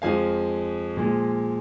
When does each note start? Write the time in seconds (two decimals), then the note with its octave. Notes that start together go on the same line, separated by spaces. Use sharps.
0.02 F2 F3 G#3 F5 G#5
0.97 A#2 F3 G#3